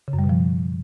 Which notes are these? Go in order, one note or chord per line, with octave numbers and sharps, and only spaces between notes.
C#3
F#2
G3
B2
F3